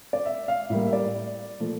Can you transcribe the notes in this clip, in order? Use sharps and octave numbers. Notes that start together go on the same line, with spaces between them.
D5
E5
F5
A2 G3 A#3 E5
E5
D5
A#2 F3 A3